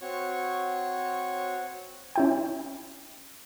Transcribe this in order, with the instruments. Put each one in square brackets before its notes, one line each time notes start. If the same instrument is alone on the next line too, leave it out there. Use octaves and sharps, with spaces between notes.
[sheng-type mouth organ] C4 F#4 C#5 C#6
[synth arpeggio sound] C#4 E4 G5